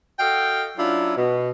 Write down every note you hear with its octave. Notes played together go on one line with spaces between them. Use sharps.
F#4 A4 D#5 F5 G5
F#3 C#4 D4 E4 F4
B2